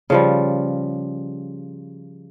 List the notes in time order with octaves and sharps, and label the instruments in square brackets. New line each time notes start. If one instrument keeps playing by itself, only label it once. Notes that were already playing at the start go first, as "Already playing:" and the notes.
[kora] C#3 F3 G3